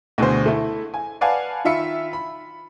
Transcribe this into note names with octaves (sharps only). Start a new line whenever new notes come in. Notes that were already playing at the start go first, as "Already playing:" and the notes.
D2 B2 D3 G#4 C5
A3 E4
G#5
B4 D5 F5 F#5 G#5 A5
D#3 F4 E5 B5 C#7
B5